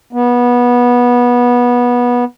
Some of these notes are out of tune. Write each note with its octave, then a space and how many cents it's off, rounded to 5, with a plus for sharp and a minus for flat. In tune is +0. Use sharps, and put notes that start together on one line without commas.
B3 -20